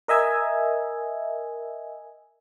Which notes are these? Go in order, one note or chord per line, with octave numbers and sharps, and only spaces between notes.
A#4 D#5 E5 G#5